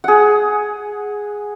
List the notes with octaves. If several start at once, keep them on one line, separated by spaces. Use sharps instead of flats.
G#4 F#5